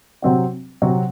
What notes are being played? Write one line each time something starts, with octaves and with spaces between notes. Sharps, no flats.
C3 F#3 C4 F#4
C3 F#3 C4 F#4